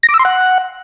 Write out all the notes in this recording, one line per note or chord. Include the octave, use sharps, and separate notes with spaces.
A#6
D6
E6
C6
F#5